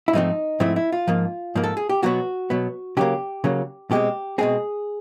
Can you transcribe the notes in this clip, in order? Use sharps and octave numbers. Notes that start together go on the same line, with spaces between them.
E4
G#2 F3 A3 C4 D#4
G#2 F3 A3 C4 E4
E4
F4
G#2 F3 A#3
G#2 F3 A#3
A4
G#4
G4
B2 F#3 B3 F#4
B2 F#3 B3
C#3 F#3 A#3 G4
C#3 F#3 A#3
B2 G#3 C4 G4
B2 G#3 C4 G#4